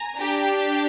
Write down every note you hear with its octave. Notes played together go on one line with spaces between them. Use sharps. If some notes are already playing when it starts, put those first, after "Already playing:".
Already playing: G#5 A#5
D4 G4